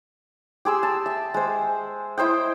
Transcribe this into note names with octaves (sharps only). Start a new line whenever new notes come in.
G4 G#4 C6 E6
A5
E5
G#3 C5
E4 C5 D#5 G5